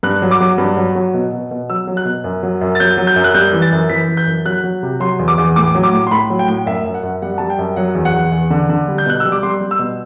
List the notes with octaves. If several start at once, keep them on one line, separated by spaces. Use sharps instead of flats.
G2 F#6
F#3
D6
F#3
G2
F#3
F#3
B2
B2
B2
F#3 E6
F#3
F#6
B2
F#2
F#3
F#2
A6
F#3 G6
F#3
G6
F#2
F#6
G3 G6
E3
A6
F#2
E3 B6
E3
G6
F#2
F#3 F#6
F#3
C3
F#3 C6
E2
D6
E2
A2 D6
F#3
D6
A2
C6
A2 B5
F#3
G5
A2
F#2 E5
F#2
F#5
F#2
G3 F#5
G3 A5
G5
F#2
F#3 F#5
E2
F#5
E2
E2
D3
D3
G3
G6
B2 F#6
G3 E6
D6
G3 C6
G3
E6
B2